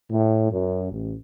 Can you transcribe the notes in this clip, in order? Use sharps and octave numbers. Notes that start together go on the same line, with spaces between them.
A2
F#2
A1